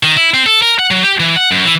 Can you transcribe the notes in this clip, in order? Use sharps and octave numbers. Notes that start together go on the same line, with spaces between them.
D#3
E4
C4
A4
A#4
F#5
F#3
G4
E3
F#5
F#2
E3